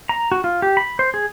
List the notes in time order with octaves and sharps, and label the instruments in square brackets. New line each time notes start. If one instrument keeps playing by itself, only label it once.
[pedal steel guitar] A#5
F#4
F4
G4
B5
C5
G#4